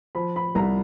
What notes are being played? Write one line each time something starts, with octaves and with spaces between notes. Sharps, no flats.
F3 B5
B5
C2 A#5